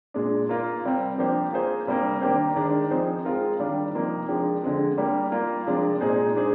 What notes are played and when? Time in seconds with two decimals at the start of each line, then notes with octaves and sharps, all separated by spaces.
0.14 A#2 G#3 D4
0.49 A#3 F4 A#4
0.84 C3 G3 C4
1.18 F3 A#3 D4 G4 C5
1.53 A#3 F4 G#4 C5
1.87 C3 G3 A#3 D4
2.21 D#3 A#3 D4 G4 C5
2.56 D#3 G#3 D4
2.91 F3 C4 D#4 G#4 C5
3.25 G#3 C4 F4 A#4
3.60 D#3 G3 D4 G4
3.94 C3 F3 A#3 D#4
4.28 F3 G#3 D4 G4
4.63 D3 F3 G#3 C4
4.98 G3 A#3 D4 G4
5.32 G3 A#3 F4
5.66 C3 F3 G#3 D4
6.01 A#2 G#3 D#4 G#4 C5
6.35 G#3 D4 G#4 C5